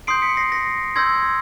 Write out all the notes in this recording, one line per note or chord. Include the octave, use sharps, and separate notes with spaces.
C6 D#6 G6 C7 D7
B6 C#7
A#6 C7
A#6 C7
C6 E6 G6 G#6 A#6